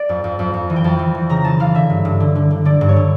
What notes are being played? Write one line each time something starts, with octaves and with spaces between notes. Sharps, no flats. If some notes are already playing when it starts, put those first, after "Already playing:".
Already playing: D5
F2
F2
F2
F2
E3
G5
F2 A5
E3
E3
C#3 A#5
E3 A5
E3 F5
D3 E5
G2
G2
D3
D3
D3
D3 D5
G2
C#5
D3